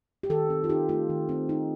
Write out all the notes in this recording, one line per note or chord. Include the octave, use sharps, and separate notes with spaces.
G4
D#3 A4
C4
F4
D#4 G4
A3 F4
D#3
C4
D#4